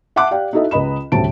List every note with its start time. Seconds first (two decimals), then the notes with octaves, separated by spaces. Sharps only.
0.16 E5 F#5 A5 C6 D6 F#6
0.31 G4 D5 F5 G5
0.53 D#4 E4 F#4 A4 D#5 E5
0.71 C#2 B4 D#5 B5 E7
1.12 D#1 D2 A2 C3 A5 D7